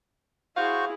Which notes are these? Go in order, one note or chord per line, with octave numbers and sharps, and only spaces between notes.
E4 F#4 G#4 C5 F5 C#6